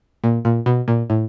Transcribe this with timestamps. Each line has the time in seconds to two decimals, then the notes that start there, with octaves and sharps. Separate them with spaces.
0.24 A#2
0.45 A#2
0.66 B2
0.88 A#2
1.10 A2